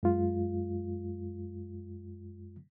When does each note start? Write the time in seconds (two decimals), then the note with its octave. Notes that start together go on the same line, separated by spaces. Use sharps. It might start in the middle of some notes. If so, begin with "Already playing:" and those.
0.03 F#2 G#3 F4